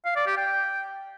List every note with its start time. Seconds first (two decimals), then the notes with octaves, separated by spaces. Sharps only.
0.05 F5
0.16 D5
0.27 G4
0.37 G5